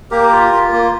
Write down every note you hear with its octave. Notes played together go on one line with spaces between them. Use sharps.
A#3 G4 A#4
F4
F4
A#3